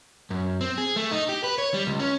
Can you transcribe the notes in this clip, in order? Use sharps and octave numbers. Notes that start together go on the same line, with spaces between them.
F#2
C4
G#4
A3
D#4
G4
B4
C#5
G3
C#2
C#4